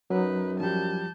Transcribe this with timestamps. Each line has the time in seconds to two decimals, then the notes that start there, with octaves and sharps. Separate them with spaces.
0.10 F#2 F#3 D#4 B4
0.60 F3 G3 A5 G6